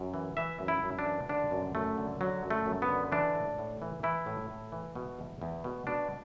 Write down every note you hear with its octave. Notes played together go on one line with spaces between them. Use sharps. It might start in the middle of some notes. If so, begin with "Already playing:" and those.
Already playing: F#2
E3
E3 E5
F#2
E4
F#2
D4
E3
D3 D4
F#2
F#2 A3
D3
D3 F#3
F#2
A3
F#2
B3
D3
E3 D4
A2
A2
E3
E3 E4
A2
A2
E3
B2
E2
E2
B2
B2 D4